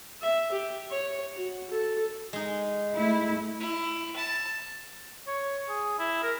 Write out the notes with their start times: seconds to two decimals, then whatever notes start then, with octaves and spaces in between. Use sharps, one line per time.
0.22 E5
0.52 G4
0.91 C#5
1.35 F#4
1.71 A4
2.33 G#3 D#4
2.94 A3 E4
3.60 E4
4.16 A5
5.27 C#5
5.69 G#4
5.99 E4
6.23 A#4